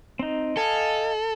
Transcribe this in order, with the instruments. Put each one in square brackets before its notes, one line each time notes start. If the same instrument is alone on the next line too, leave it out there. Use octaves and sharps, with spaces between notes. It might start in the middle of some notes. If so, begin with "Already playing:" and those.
[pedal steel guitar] C4 D#4
[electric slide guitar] A4 [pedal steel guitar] D#5 F5 G#5